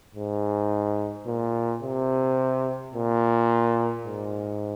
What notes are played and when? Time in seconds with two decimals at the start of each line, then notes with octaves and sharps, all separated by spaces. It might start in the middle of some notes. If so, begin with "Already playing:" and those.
0.15 G#2
1.26 A#2
1.82 C3
2.94 A#2
4.05 G#2